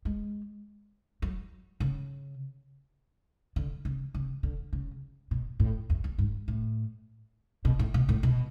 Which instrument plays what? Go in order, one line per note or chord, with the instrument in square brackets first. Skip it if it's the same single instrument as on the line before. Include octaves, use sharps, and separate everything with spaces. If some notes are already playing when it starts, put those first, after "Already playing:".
[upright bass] G#3
F#3
C#3
D3
C#3
C#3
D3
C#3
B2
A2
E2
E2
G#2
A2
B2
A2
B2
A2
B2